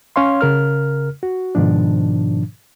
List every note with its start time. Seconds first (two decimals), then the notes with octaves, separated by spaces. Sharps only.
0.16 C#4 C#5 F5 C6
0.41 C#3 A#4 F6
1.23 F#4
1.55 G#2 B2 D#3 F3 D4